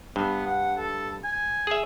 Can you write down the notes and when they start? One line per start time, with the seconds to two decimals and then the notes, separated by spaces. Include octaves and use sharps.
0.16 G2 B3
0.46 F#5
0.78 A4
1.24 G#5
1.67 G#4 E5